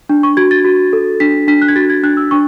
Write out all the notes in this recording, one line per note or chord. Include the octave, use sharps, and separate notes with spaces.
D4
C#6
F#4 G#6
A6
F#4
A4
D4 B6
D4 B6
F#6
G#6
F#4 A6
G#6
D4 F#6
E6
D4 C#6